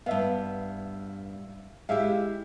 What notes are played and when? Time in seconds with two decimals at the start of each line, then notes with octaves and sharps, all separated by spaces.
0.06 G2 B3 E5 F5
1.89 G#3 E4 G4 E5 F5